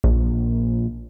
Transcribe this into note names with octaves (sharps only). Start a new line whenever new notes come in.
A#1